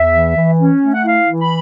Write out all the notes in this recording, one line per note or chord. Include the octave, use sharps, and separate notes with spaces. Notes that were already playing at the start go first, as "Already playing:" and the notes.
Already playing: E2 E5
E3
E3
C#4
A3
F#5
E4 F5
E3
B5